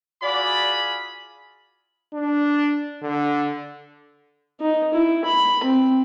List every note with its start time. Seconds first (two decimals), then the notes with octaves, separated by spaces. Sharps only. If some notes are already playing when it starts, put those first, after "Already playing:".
0.23 F4 F#4 G#4 D5 B5
2.14 D4
3.02 D3
4.61 D#4
4.93 E4
5.25 B5
5.64 C4